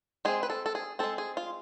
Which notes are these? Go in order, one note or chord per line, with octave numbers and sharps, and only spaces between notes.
G#3 C4 G#4
B4
A4
A4
G#4
G#3 C4 A4
G#4
F4